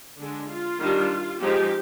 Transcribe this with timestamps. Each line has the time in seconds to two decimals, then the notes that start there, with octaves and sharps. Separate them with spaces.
0.19 D3 G#3 D4
0.49 F4
0.80 D#3 G3 D4
1.39 F3 G#3 C4 D#4 G4